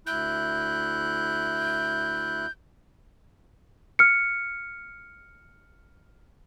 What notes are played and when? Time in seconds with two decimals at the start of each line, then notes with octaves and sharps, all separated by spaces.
0.07 D2 E4 F#6 G6
3.99 F6 C#7